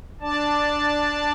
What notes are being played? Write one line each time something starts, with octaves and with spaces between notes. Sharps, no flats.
D4 D5 A5